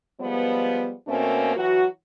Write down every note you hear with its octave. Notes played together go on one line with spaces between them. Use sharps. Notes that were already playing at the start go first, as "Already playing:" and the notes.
F3 G3 G#3 B3
B2 A3 A#3 C4 C#4
E3 F#3 F#4